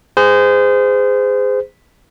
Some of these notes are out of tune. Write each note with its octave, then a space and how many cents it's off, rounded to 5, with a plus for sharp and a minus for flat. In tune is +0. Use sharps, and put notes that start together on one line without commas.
G#4 -15 C5 -30